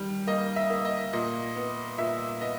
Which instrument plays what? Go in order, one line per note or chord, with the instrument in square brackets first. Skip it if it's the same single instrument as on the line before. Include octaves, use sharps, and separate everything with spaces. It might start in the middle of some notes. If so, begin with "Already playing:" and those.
Already playing: [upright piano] D#3 G3
A#3 D#5
E5
A#3
D#5
A#2 D#5
B3
A#2 E5
B3 D#5